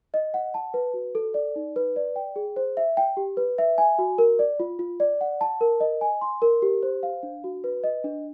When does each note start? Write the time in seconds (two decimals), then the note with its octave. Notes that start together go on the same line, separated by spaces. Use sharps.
0.14 D#5
0.34 F#5
0.54 A5
0.74 B4
0.94 F#4
1.15 A4
1.34 D5
1.56 D#4
1.76 B4
1.96 D5
2.16 G5
2.36 G#4
2.56 C5
2.77 E5
2.97 G5
3.17 G4
3.37 B4
3.58 E5
3.78 G#5
3.98 F#4
4.18 A#4
4.39 D5
4.60 F4
4.79 F4
5.00 D5
5.21 F#5
5.41 A5
5.61 A#4
5.80 D#5
6.01 G#5
6.21 C6
6.42 A#4
6.62 G4
6.83 C5
7.03 F5
7.23 D4
7.44 F#4
7.64 B4
7.84 D#5
8.04 D4